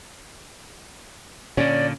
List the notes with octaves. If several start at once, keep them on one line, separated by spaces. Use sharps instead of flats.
A#2 D3 C#4 D5